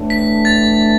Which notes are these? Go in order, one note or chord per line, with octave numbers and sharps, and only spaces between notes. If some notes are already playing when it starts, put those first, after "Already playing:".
Already playing: A2 E3 A3 D4
B6
A6